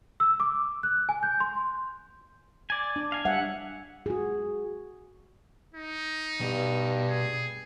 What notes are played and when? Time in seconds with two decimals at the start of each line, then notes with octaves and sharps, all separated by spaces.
0.20 E6
0.40 D6
0.83 F#6
1.09 G#5
1.23 G6
1.40 C6
2.70 D5 G#5
2.96 D4
3.12 F5 G#5
3.25 G3 E5 F#5
4.06 F#4 G#4
5.74 D#4
6.41 G2 B2
7.09 G#4